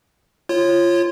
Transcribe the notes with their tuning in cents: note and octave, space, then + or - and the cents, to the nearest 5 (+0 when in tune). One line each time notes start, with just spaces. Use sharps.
F4 -20 C#5 -25